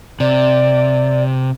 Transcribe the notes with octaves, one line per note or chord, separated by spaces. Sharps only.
C3 D5